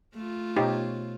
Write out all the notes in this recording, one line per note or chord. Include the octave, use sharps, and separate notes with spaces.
A3 F4
B2 D#4 G4 C5 C#5